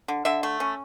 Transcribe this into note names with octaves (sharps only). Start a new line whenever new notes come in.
D3
D3 E5
A3
C#4